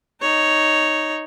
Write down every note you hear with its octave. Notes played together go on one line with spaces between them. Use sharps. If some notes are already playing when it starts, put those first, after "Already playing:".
D#4 C#5